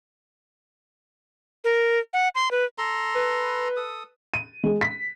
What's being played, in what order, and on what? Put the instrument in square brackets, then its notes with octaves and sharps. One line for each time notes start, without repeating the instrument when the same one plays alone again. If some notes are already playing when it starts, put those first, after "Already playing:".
[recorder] A#4
F#5
C6
B4
[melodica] A4 A#5 C6
[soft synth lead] B4
[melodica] A4 D#6
[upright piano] D#7
G#3
B6